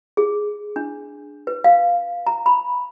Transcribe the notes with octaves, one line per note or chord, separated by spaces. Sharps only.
G#4
D4
B4
F5
A#5
B5